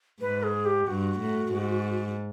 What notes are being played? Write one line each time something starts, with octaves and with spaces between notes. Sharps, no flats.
G#2 B4
G#4
G4
G2 F#4
A2
G#2